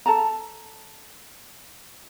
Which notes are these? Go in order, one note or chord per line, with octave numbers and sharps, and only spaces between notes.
A4 A5 A#5